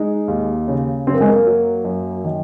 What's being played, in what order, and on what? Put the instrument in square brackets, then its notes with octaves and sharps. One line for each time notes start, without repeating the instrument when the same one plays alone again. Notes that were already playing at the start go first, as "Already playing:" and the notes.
Already playing: [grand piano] G#3 [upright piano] D#4
[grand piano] D#2
C#3
[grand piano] F#2 [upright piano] C4
[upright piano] A#3
G#3
A#3
[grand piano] F#3
F#2
D#3